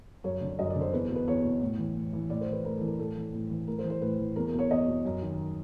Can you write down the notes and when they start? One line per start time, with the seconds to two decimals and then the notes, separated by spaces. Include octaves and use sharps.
0.24 F#2 C#5
0.41 D3
0.59 F#2 D#5
0.70 D5
0.76 D3
0.81 C5
0.93 E2 B4
1.10 B2
1.16 B4
1.27 E2 C#5
1.44 B2
1.61 A2
1.79 E3
1.96 A2
2.13 E3
2.30 A2 D5
2.41 C5
2.47 E3 B4
2.64 A2 A#4
2.76 E3 A4
2.88 A#4
2.99 A2 A4
3.16 E3
3.33 A2
3.51 E3
3.67 A2 A#4
3.78 C5
3.84 E3
3.90 C5
4.02 A2 B4
4.19 E3
4.36 E2 A#4
4.47 A#4
4.53 B2
4.59 C#5
4.71 E2 D#5
4.88 B2
5.05 F#2
5.22 D#3